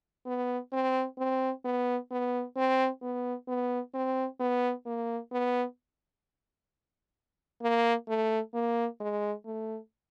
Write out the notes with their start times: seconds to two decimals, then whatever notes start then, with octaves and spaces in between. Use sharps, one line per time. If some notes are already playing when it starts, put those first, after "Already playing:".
0.26 B3
0.72 C4
1.18 C4
1.65 B3
2.11 B3
2.56 C4
3.02 B3
3.48 B3
3.94 C4
4.40 B3
4.86 A#3
5.32 B3
7.62 A#3
8.08 A3
8.54 A#3
9.00 G#3
9.46 A3